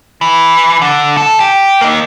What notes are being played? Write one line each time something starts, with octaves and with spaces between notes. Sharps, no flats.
E3
D3
A4
G4
A#3 D#4